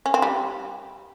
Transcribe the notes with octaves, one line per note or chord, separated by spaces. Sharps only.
C#4
C4
G3